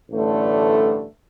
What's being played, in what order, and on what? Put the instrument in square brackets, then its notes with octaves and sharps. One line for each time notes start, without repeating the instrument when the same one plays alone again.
[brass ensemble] A1 G2 D3 A3